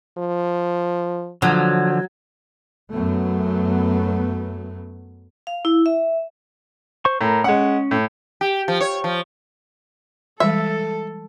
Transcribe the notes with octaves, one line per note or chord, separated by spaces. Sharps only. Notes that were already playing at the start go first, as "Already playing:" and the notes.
F3
D3 F3 F#3
F#2 F#3 A3 B3
F5
E4
E5
C5 C#6
A2 A#4
G#3 C#4 F#5
A2
G4
F3
C#5
F3
E3 G3 G#3 A4 E5